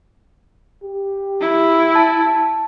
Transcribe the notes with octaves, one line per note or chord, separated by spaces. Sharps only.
G4
E4
A5